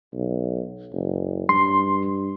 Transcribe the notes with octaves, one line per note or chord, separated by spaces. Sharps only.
B1
F#1
G2 C6